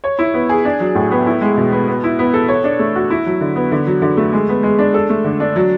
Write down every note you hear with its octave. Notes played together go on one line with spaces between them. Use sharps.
C#5
E4
B3
G#4
D4
F#3
A2
B3
E4
G#3
B2
B3
B3
E4
B3
A4
C#5
D4
A3
F#4
E4
F#3
D3
B3
D3
F#3
D3
A3
G#3
B3
G#3
D4
A4
A3
D3
D4
F#3